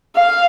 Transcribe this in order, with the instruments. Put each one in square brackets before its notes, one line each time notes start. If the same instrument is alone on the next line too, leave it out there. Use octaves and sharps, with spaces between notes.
[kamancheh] F5